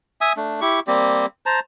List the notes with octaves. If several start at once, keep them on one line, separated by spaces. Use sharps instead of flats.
E5 G#5 D#6
A3 D4
E4 G4 C#6
G3 A#3 C4 G4
C5 A5 A#5